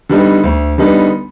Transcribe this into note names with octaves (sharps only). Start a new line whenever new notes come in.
D3 G3 B3 D#4
D2
D3 G3 B3 D#4